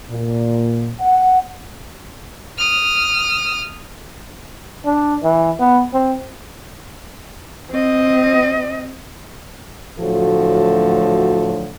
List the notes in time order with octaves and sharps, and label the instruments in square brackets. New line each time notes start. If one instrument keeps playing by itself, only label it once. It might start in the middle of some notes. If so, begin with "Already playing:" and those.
[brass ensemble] A#2
F#5
[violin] D#6 F6
[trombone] D4
E3
B3
C4
[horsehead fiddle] C4 D#5
[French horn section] D2 A2 F3 F#3 F#4 A4